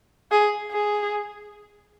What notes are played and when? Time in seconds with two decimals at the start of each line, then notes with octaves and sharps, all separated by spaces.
0.31 G#4
0.72 G#4